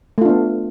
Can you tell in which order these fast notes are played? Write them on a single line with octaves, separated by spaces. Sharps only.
A3 F4 D4 B3